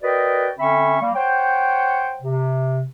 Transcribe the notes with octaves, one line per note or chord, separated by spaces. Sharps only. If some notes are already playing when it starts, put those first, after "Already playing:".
F#4 A#4 B4 D5 D#5 G5
D3 C4 C#4 E5 B5 C#6
G3 A#3
C5 C#5 F#5 G5
C3